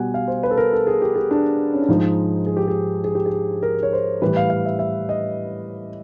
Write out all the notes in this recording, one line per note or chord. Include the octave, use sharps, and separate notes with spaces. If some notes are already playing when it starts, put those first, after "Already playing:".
Already playing: B2 G3 F#5 G#5
F5
C5
B4
A4
A#4
A4
G#4
G4
G#4
D4
C#4
D4
G#2 F3 G#3 D#4
G#4
G4
G#4
G#4
G4
G#4
A#4
C#5
C5
A2 E3 G3 B4
F5
F5
E5
E5
D#5